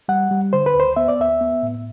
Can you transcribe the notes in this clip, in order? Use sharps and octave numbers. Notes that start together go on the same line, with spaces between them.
G3 F#5
G3
D3 C5
B4
D2 C5
B3 E5
D5
D2 E5
B3
A2